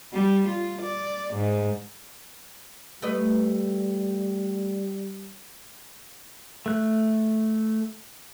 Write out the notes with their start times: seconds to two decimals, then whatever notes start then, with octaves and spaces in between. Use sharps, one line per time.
0.13 G3
0.48 F4
0.82 D5
1.34 G#2
3.02 G3 A3 B4 D#5
6.66 A3 F#6